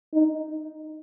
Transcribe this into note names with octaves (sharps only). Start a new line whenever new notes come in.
D#4